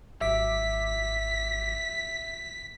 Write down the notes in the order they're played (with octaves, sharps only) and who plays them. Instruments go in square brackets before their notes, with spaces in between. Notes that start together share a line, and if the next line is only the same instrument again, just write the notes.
[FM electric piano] G#1 F#3 D6 [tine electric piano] E5 [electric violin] B6